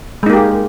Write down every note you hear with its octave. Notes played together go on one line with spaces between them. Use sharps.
G#3 A#3 D#4 G4 G#4